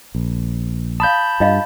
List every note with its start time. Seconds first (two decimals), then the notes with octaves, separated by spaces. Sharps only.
0.15 A#1
1.00 F5 A5 B5 D#6 G6
1.40 G2 F4 D#5 F5